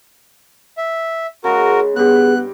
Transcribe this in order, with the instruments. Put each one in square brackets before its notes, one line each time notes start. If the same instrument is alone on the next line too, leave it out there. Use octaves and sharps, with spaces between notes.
[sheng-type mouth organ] E5
[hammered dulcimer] C#3 G#3 [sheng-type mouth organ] F#4 A#4
[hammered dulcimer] G2 G4 [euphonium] B3 [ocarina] G#4 [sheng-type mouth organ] F#6